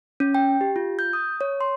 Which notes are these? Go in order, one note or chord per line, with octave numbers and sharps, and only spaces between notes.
C#4
G5
G4
F4
G6
D#6
C#5
C6